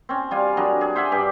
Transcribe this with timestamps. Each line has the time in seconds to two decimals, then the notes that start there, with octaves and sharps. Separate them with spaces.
0.09 C4 C#4
0.31 G3 F4 G#5
0.57 F#3 D4 G#4 A#4
0.81 G#4
0.96 C5 E5 F#5 G#5
1.12 G2 G4